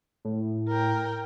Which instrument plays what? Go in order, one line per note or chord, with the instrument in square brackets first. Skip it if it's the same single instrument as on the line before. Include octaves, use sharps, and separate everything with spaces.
[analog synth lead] A2
[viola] A#4 G5